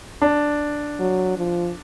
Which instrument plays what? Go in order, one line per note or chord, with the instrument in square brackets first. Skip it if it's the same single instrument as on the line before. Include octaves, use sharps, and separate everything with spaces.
[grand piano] D4
[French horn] F#3
F3